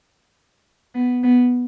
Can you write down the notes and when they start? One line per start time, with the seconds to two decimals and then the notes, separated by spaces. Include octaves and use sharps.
0.95 B3
1.23 B3